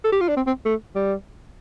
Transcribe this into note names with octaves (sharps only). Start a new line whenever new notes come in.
A4
G4
F4
D4
C4
C4
A3
G3